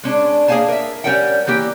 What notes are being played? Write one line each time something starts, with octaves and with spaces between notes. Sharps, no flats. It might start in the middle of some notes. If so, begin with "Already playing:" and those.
G#3 C#4 D4
A#3 G#4 C#5 F5 G#5 A5
A#4 E5
G3 C#4 A#4 C#5 F#5 G5
E3 A#3 G4 G5